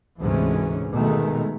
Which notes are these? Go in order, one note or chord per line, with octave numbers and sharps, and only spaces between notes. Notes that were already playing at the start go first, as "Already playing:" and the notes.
D2 G#2 C3 E3 G#3 C#4
B2 D#3 G#3 A3